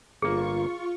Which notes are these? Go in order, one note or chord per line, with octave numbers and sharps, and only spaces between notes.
G1 A#3 F4 G#4 C#6